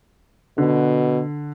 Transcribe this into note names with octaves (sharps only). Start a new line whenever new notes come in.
B2 D3